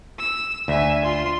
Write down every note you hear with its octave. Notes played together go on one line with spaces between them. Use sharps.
E6
D2 E5 G#5
F4 C6